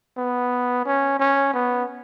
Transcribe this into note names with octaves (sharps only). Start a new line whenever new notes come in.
B3
C#4
C#4
B3